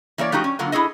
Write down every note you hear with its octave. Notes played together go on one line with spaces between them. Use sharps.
E3 A#3 C#5 D5
F3 A3 D#4 F#4 G4
C#4
D3 F#3 A#3 F4
E4 F4 G#4 A4 D#5